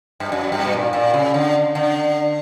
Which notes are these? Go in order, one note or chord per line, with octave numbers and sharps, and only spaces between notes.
G2
F#2
G2
B2
A#2
A#2
C#3
D3
D3